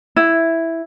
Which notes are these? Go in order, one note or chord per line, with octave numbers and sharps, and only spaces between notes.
E4